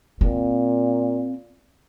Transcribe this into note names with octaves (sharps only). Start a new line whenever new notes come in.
A#2 C4